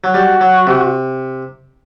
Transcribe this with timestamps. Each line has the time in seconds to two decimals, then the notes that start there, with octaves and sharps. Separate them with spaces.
0.04 F#3
0.14 G3 F#4
0.41 F#3
0.67 C3